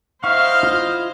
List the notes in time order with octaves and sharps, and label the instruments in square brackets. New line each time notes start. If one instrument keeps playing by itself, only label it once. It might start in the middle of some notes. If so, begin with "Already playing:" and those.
[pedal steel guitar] E4 F#5 C#6 [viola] C5 D#5 [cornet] F5 [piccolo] F6
[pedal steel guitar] E4 F4